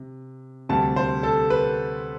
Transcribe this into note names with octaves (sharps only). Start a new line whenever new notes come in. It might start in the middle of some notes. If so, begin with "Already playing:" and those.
Already playing: C3
D2 C3 G3 A5
C5
A4
B4